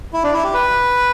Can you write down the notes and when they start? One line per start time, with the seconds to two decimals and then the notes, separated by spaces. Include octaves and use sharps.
0.13 E4
0.24 D4
0.33 E4
0.44 G4
0.54 B4